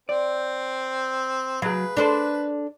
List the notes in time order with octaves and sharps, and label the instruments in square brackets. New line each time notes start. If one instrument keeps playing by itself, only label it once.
[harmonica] C4 [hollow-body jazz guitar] D5
[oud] F#3 [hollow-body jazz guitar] G#4 F5 [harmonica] B4
[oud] D4 A4 C5